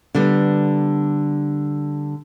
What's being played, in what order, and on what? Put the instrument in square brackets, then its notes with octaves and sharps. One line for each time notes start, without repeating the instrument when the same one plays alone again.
[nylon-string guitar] D3 G3 B3